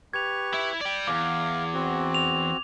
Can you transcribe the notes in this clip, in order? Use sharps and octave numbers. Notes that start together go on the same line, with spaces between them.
G4 B4 C#6 G#6 F7
E4
D5 G5
E2 F5 D6
C4 F#4
F7